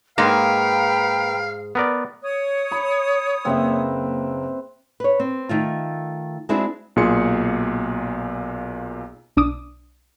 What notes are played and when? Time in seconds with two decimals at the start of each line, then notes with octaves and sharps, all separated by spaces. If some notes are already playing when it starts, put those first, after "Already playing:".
0.18 G#2 G#3 A#3 B4 F5 G5 A#5
1.75 B3 A#4 D5
2.22 C#5 D#6
2.72 B5
3.45 F#1 A#3 C4 B4 E5
5.00 B4 C#5
5.20 C4
5.49 D#3 A3 F4
6.49 G#3 C4 D4 E4 F#4 G#4
6.96 B1 A#2 F4 G#4 C6 C#7
9.36 B1 D4 D6 D#6